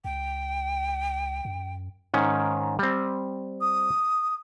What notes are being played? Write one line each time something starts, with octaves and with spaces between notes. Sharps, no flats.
C#2 G5
F#2
G#2 D#3 C#4
G3 C4
D#6